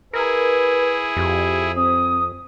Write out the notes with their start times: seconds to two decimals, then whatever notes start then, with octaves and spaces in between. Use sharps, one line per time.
0.13 E4 G#4 A#4 B4
1.17 F2 G4
1.76 C4 D#6